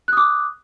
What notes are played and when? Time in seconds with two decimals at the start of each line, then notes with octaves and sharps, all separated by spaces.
0.08 F#6
0.13 D#6
0.17 D6